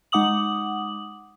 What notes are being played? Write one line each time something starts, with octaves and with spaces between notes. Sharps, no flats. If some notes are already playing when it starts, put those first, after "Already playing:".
G#3 D#4 F#5 D6 D#6 F#7